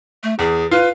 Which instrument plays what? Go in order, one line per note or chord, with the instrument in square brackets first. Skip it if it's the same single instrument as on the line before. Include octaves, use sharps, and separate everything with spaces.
[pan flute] A3
[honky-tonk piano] E2 [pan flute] G#4
[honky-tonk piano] F4 [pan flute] B4